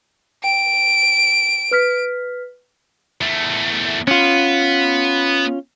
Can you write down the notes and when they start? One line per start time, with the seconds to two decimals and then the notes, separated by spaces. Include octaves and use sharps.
0.44 G5 D7
1.71 B4 F6 B6
3.21 E2 A3
4.07 B3 C#4 F4